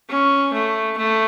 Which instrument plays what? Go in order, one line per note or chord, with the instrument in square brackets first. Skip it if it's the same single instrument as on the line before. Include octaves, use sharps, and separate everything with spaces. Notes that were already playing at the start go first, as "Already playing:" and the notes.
[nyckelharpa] C#4
A3
A3